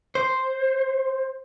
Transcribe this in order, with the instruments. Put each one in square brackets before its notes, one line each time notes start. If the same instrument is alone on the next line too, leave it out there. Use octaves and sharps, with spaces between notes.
[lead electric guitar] C5